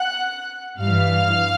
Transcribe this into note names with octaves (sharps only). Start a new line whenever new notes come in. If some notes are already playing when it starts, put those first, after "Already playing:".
Already playing: F#5 F#6
G2 E3 F5 F6